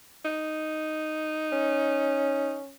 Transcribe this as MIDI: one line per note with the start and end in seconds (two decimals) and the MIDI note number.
0.25 2.58 63
1.52 2.76 61